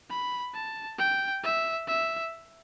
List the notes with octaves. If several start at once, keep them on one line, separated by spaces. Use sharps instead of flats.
B5
A5
G5
E5
E5